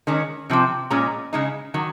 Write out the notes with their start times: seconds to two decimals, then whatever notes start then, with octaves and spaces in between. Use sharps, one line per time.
0.07 D#3 G#3 C#4
0.50 C3 F3 C4
0.90 A#2 G#3 C#4 A#5
1.33 C#3 G#3 D#4
1.74 D#3 F#3